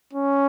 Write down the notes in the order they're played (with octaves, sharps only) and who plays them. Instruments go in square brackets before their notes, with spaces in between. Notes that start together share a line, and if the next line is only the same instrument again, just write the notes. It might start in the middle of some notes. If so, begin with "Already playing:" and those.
[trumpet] C#4